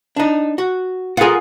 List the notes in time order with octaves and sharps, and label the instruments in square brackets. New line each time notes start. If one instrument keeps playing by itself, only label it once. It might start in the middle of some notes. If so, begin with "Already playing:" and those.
[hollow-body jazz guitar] D4 D#4
F#4
[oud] F4 G#4 [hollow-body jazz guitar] A#4 B4 F#5